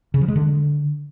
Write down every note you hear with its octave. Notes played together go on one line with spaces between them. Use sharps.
C#3
F3
G#3
D3